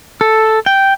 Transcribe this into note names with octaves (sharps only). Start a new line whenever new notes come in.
A4
G5